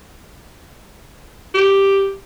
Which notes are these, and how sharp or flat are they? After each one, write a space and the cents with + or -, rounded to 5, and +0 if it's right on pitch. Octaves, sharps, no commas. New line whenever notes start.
G4 +0